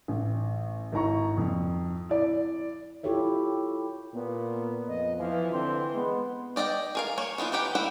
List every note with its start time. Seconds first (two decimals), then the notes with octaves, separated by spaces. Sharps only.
0.08 A1
0.92 G#1 E4 A#5 C#6
1.37 F2
2.09 E4 D5
3.03 E4 F4 G4 A4 C#5 E5
4.14 A#2 B3
4.88 F2 D#5
5.19 E3 F3 F5
5.52 D3 E3 C4 C6
5.94 G#3 B3
6.56 G4 D5 D#5 F5 G5
6.95 G#4 A#4 F5
7.18 A#3 C#5
7.38 E3 B3 D#4 F4
7.52 E3 D#4 G4 F#5
7.75 A#3 E4 F#5 G5